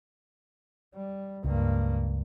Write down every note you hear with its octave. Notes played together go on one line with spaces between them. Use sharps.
G3
C#2 G2 A#3